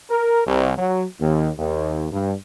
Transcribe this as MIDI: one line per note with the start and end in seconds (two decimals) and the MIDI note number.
0.10 0.40 70
0.47 0.73 36
0.78 1.04 54
1.21 1.49 39
1.58 2.07 39
2.12 2.33 43